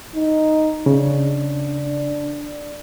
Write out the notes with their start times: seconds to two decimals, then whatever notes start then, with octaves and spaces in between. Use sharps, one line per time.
0.15 D#4
0.86 C#3 D4